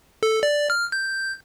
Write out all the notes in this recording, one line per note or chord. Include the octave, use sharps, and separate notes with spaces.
A4
D5
F6
G6